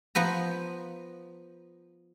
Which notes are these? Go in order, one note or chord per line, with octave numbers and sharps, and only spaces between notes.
F3 B3 B4 A#5